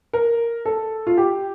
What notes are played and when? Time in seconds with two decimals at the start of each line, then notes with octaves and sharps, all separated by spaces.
0.13 A#4
0.65 A4
1.07 F4
1.18 G4